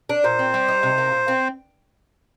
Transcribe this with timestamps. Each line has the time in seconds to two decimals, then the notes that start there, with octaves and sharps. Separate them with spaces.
0.09 D4
0.24 A#2 C5
0.39 C4
0.54 G3
0.68 D#4
0.83 C3
0.98 A#3
1.12 A#2
1.28 C4